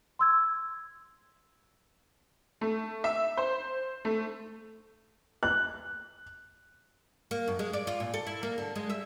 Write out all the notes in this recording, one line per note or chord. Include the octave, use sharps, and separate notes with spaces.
C6 E6 G#6
A3
E5
C5
A3
F#6
A#3
F#2
G#3
D5
F4
A#2
A4
E4
A#3
D3
G#3
E5